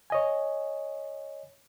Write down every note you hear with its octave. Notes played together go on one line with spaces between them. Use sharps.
C#5 D#5 G#5